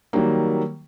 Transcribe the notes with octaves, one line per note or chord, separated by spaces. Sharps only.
D#3 F#3 G3 A#3